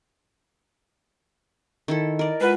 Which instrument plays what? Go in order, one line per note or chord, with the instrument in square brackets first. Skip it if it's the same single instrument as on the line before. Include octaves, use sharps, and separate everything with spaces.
[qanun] D#3 E4 A4
[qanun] A#4 D5 [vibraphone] D#5
[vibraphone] G#3 F4 F#5 [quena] B4